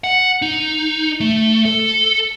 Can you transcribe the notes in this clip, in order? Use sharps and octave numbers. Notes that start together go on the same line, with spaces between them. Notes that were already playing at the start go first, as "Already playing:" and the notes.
F#5
D#4
A3
A4